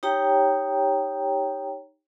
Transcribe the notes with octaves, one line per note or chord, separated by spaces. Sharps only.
D#4 G4 C#5 G5 A#5